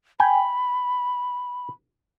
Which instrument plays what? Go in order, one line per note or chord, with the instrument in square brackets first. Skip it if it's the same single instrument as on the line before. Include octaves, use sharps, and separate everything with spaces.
[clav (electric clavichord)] G5 G#5 [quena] B5